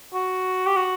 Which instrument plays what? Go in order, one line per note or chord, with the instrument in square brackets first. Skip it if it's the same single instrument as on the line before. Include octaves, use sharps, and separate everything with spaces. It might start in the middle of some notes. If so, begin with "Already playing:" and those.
[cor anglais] F#4
G4
F#4